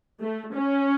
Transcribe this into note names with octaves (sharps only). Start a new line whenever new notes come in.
A3
C#4